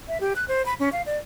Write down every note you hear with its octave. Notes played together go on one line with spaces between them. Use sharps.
E5
G4
F#6
C5
B5
C#4
F5
D5